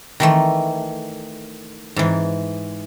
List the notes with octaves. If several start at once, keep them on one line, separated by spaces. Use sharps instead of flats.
D#3 E3 A3
G#2 E3